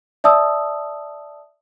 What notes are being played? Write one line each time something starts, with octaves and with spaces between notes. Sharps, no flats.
D5 E5 A5 D#6 E6